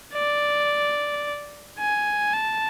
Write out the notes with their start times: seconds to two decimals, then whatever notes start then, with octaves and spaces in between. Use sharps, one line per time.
0.14 D5
1.79 G#5
2.34 A5